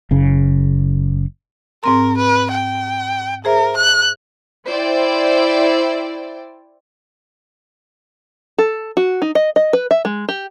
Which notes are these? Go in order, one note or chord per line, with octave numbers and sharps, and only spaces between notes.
F#1 C#3
G#2 C4 A#4 C6
B4
G5
G#4 A#4 C5 E5
F#6
E4 C5 D5 G5
A4
F#4
D#4
D#5
D#5
B4
E5
G#3
G4